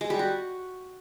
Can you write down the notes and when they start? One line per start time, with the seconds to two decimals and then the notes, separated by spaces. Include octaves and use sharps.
0.01 G#3
0.10 G3
0.19 F#4